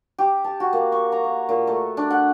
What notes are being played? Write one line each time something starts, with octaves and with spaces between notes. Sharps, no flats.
G4
A5
F#4
A#3
C#6
A#5
A#3
A#2
A3
D4
F#5